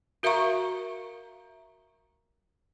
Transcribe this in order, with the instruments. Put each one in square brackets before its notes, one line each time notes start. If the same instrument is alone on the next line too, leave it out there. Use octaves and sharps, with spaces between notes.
[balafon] F#4 A#4 E5 F5 A#5 C#6